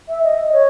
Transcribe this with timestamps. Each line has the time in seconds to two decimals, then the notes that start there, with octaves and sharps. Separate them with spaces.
0.09 E5
0.23 D#5
0.53 C#5